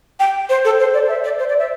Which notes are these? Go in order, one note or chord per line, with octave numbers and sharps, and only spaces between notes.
G5
C5
A4
C5
D5
E5
D5
C5
D5
E5